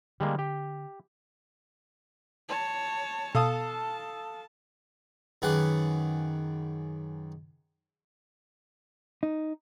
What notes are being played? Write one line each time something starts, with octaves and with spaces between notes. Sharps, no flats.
D3 G3 G#3 A#3
G4
C#5 A5
B2 A4 F5 A5 D#6
F#2 D#3 G#4 B4 F#5 D6
D#4